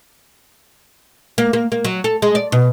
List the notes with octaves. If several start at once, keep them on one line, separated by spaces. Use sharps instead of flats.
A#3
A#3
A#3
F#3
A4
G#3
D5
B2